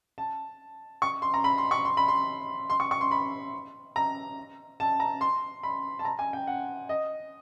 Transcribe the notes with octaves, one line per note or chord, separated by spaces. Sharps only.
A5
C#6
C6
A#5
B5
C6
C#6
C6
B5
C6
C6
C#6
C#6
C6
B5
A#5
A5
A#5
C6
B5
A5
A#5
G#5
G5
F#5
D#5